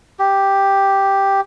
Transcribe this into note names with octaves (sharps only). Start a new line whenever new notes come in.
G4